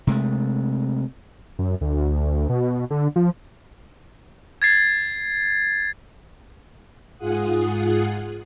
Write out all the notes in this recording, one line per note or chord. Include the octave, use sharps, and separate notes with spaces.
C3 G#3 A3
F#2
D2
B2
D3
F3
G#6 A6 C7
G#2 F4 G#4 F#5 D#6 F#6